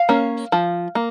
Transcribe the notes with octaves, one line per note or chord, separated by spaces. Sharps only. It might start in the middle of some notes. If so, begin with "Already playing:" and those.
Already playing: F5
A#3 C#4
F3
A#3